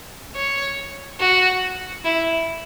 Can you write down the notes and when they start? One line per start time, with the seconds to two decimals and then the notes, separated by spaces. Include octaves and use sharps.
0.35 C#5
1.20 F#4
2.04 E4